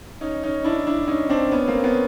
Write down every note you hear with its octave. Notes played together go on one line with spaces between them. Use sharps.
C#4 D#4
C#4 D#4
D4 E4
D4 E4
C#4 D#4
C4 D4
B3 C#4
A#3 C4
B3 C#4